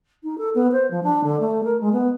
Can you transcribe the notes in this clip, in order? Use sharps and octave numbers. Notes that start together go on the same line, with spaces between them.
D#4
A4
B3
C5
F3
D4
D3
A3
A#4
G#3
B3